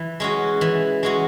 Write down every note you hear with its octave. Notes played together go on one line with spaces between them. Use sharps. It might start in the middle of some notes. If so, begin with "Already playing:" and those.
Already playing: E3
G#3 C#4 F#4
E3
G#3 C#4 F#4